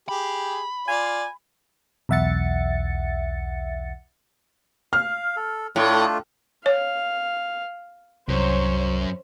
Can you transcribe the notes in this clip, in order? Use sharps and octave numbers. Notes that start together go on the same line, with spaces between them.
G4 G#4 B5
F4 D5 F5 G#5
B1 E2 E5 F#5 A6 C#7
F5 F6
A4
A2 A3 D4 F4
C#5 F5
C2 F#2 C5 C#5